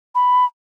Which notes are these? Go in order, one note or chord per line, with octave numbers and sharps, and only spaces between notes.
B5